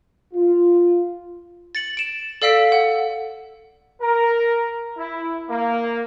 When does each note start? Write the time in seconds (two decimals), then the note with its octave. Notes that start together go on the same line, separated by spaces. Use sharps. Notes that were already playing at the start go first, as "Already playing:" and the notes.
0.34 F4
1.75 A6 C#7 F#7
1.97 D7 E7
2.42 A4 D5 F5 E6 B6 D7
2.72 F#5
4.00 A#4
4.97 E4
5.49 A#3